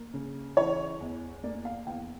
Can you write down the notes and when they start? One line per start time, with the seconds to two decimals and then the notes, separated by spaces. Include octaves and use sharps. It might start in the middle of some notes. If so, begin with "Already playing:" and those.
Already playing: A#3
0.14 C#3
0.57 E3 C#5
1.00 E2
1.44 A#3 D5
1.65 F5
1.87 E2 G5